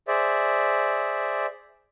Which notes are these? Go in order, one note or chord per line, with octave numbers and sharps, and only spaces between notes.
G#4 C5 D5 E5